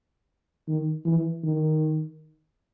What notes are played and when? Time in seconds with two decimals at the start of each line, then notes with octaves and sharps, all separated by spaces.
0.68 D#3
1.06 E3
1.44 D#3